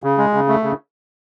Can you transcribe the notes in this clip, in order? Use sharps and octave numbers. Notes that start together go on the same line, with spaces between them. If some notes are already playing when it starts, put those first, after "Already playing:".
C#3
G#3
C#3
A3
C#3